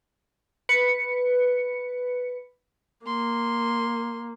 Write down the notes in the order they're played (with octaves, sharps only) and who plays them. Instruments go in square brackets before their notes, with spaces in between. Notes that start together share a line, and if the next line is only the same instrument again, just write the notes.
[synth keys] B4 C#7
[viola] A#3 [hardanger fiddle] C6